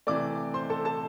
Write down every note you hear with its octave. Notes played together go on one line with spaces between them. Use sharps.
C3 E3 A3 D5 D6
C5 C6
A4 A5
A4 A5